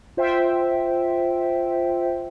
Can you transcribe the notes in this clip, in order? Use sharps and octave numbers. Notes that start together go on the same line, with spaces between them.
F4 C5 E5 G5